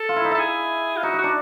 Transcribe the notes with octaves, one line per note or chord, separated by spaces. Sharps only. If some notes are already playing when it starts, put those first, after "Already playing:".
Already playing: A4
F4
E4
D#4
E4 A4
G#4
F4
D#4 F#4
D#4
D4 F#4